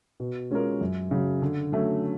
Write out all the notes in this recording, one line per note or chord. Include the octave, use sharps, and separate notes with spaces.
B2
G#3 C#4 F4 A#4
F#2
C#3 F#3
D3
F#3 A3 C#4